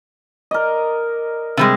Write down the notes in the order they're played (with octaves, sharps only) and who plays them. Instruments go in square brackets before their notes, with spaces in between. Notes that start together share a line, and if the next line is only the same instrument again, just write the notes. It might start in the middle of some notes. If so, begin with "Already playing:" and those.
[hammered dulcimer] A#4 D5 D#5
[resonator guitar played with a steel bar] C3 G3 G#3